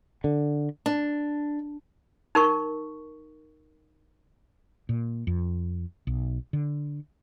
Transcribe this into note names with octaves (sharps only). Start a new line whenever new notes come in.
D3
D4
D#4 A#4 C#6
A#2
F2
B1
D3